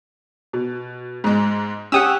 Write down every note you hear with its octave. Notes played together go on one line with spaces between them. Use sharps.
B2
G#2 G#3
C#4 G4 F#5 D#6 E6